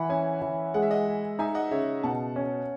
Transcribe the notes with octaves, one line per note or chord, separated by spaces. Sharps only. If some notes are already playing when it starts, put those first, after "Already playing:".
Already playing: E3 F#5 B5
C#4 E5 G#5
E3
G#3 F#5
E5
D#5 F#5
G#4
D#4 E5 G#5
D#5 F#5
C#3 C#5 E5
B2 F#5 A5
C#4